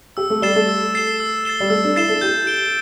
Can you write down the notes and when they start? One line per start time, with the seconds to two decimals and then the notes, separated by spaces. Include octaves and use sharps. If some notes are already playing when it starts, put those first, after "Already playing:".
0.17 G4 E6
0.30 A3
0.42 G3 A6 C7 E7 G7
0.56 A3
0.69 E6
0.95 A6 C7 E7 G7
1.20 E6
1.45 A6 C7 E7 G7
1.60 G3
1.70 A3 E6
1.84 D4
1.96 E4 A6 C7 E7 G7
2.10 A4
2.21 G4 G6
2.47 D7 G7